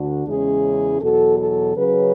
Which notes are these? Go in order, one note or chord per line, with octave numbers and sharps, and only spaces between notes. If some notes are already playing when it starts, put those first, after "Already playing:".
Already playing: D2 D3 D4 F#4
E2 C#3 G#3 C#4 E4 G#4
E2 B2 F#3 F#4 A4
F#4 A4
C#3 F#3 C#4 G#4 B4